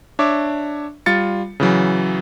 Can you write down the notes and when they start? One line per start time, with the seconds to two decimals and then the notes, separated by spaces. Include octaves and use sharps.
0.19 D4 C#5 E5 D6
1.06 G3 F4 A6 C#7
1.60 C#3 E3 F#3